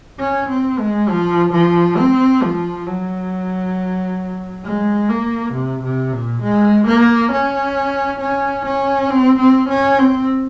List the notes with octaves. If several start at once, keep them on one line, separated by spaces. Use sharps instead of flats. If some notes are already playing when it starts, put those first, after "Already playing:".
C#4
C4
G#3
F3
F3
C4
F3
F#3
G#3
A#3
C3
C3
A#2
G#3
A#3
C#4
C#4
C#4
C4
C4
C#4
C4